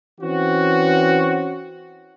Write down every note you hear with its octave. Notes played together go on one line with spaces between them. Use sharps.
E3 C4 C#4 F#4